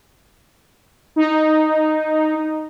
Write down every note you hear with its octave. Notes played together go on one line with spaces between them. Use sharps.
D#4